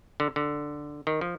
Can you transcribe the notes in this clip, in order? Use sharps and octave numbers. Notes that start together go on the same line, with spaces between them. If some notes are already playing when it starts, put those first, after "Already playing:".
D3
D3
D#3
F3